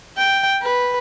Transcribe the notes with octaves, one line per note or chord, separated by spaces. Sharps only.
G5
B4